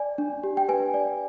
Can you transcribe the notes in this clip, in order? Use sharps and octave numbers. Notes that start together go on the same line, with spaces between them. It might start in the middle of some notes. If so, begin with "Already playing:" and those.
Already playing: D5 G#5
D4
G4
G5
B4 G#5
D5